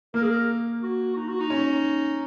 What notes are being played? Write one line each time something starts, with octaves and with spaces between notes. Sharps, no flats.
A#3 A#4
G#4
A#4
F#4
D#4
F#4
D#4
C#4